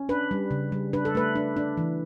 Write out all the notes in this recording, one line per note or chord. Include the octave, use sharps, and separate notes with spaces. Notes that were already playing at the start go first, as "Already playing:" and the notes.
Already playing: C#4
D4 B4
G3
C#3
G3
D4 B4
A4
A3 B4
D4
D4
E3